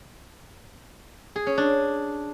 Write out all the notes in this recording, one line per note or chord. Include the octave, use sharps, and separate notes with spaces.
G#4
C#4
D4